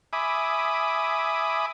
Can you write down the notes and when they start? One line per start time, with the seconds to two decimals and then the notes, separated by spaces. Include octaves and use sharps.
0.13 E5 G#5 B5 D6 D#6